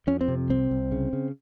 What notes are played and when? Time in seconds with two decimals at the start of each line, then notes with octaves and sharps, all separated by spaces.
0.07 F2 C#4
0.21 C4
0.28 C3
0.49 C2 C4
0.71 C2
0.92 C#3
1.13 C#3